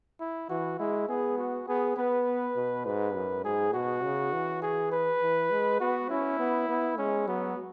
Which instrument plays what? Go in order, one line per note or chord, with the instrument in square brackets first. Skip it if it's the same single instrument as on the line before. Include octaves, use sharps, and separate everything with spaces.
[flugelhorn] E4
[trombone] E3 [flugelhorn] F#4
[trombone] G#3 [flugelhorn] E4
[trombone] B3 [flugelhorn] G#4
[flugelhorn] F#4
[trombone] B3 [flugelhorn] G#4
[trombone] B3 [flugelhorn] B4
[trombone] B2
[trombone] G#2 [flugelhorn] B4
[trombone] F#2
[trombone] G#2 [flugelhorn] G#4
[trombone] B2 [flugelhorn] F#4
[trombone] C#3
E3
[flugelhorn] G#4
B4
[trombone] E3
G#3
[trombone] B3 [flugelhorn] F#4
[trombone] C#4 [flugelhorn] E4
[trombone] B3
B3
[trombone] G#3 [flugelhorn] C#4
[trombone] F#3 [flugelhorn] B3